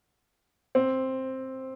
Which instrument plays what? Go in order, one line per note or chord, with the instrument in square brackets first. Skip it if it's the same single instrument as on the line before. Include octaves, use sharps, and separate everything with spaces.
[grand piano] C4